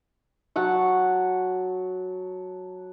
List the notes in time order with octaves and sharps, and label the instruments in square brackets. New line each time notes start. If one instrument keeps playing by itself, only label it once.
[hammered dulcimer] F#3 F#5 A5 C#6